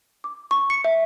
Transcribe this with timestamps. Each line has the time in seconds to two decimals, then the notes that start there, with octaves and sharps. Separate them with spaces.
0.24 D6
0.51 C#6
0.70 C#7
0.84 E5